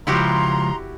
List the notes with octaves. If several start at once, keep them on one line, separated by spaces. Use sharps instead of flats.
C#2 F3 E4 F#4 G4 A#5 C6